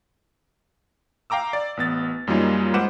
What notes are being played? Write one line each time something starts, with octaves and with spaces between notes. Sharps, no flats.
F5 G5 A#5 D6 E6
D5
A1 B3 A6
F#2 G3 A#3 C#4 D#4 F4
G#3 B4 C5 F#5 D6 E7